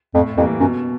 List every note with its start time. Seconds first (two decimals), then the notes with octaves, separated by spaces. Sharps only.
0.14 F2 A2
0.37 F2 E3 G3 A#3
0.60 F#2 B2